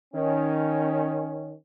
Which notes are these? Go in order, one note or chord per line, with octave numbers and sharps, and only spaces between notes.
D#3 C#4